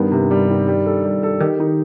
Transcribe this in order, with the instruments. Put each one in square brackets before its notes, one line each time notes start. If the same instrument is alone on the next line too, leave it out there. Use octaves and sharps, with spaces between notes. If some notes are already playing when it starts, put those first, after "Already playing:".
Already playing: [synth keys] G2 [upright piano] D#3 B3
[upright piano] C3
G3
D#3
G3
A4
G3
A4
[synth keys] D#3 [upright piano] G4
[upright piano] D#4